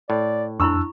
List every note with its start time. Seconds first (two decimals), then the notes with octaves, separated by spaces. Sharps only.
0.10 A2 D5
0.60 F2 D4 E4 B5 C#6 E6